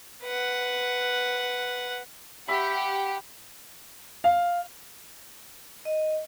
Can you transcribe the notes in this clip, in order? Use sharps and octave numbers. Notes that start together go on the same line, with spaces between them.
B4 F#5
G4 E5 F#5 B5
F5
D#5